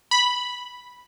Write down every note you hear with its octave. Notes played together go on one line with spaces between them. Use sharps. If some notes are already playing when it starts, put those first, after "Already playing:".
B5